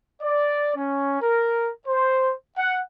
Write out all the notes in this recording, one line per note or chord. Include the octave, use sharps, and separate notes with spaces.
D5
C#4
A#4
C5
F#5